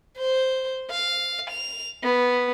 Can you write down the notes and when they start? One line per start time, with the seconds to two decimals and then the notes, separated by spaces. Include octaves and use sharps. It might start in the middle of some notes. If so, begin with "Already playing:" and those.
0.18 C5
0.90 F5
1.50 F7
2.03 B3